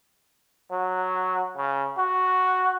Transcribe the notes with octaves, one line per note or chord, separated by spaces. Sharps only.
F#3
C#3
F#4